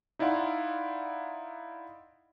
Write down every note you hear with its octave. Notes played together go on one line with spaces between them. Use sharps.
D#4 E4 D5 F5 F#5 C6